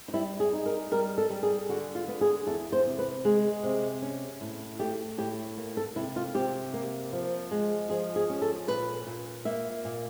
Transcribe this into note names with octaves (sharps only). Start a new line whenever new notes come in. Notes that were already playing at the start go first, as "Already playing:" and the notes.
D#4
G3 E4
G#4
D#4
A#4
G3 A#4
A4
G3
G#4
D3 F#4
F4
B3
G#4
E2 A4
C5
C3
B4
G#3 G#4
C3
C#4
A2
A3 G4
A2 G4
A#3
A4
C3 E4
F4
C3 G4
A#3
F3
G#3
F3 G#4
G#4
C#4
A4
A#2 B4
A#2
A#3 E5
A#2